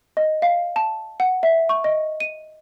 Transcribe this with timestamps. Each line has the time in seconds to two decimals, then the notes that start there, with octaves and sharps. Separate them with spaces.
0.17 D#5
0.42 F5
0.76 A5
1.20 F#5
1.43 E5
1.69 C#6
1.84 D#5
2.20 D#7